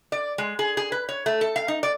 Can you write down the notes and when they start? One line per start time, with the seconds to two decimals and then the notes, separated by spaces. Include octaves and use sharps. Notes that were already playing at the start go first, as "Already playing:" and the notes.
0.12 D5
0.38 G#3
0.59 G#4
0.77 G#4
0.92 B4
1.09 C#5
1.26 A3
1.41 A4
1.56 F5
1.68 D#4
1.83 D5